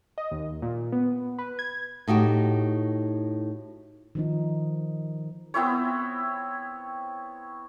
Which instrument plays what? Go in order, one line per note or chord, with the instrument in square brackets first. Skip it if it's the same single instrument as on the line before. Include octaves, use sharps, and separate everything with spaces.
[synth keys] D#5
D#2
A#2
B3
B4
G#6
[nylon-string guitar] A2 D#4 F#4 G4
[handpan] D#3 F3 D#4
[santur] B3 C4 E4 C#5